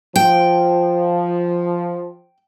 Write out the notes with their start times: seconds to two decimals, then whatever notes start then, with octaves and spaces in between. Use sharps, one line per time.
0.16 F3 G5